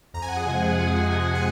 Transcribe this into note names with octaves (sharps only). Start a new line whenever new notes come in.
F2 A#5
G#5
F#5
G#4 G#5
C3 F3 G#3
F2
C3 F3 G#3
G#5